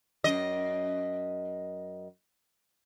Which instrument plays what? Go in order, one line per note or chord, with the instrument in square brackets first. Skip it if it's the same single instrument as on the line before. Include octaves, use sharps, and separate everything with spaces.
[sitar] F#2 D#5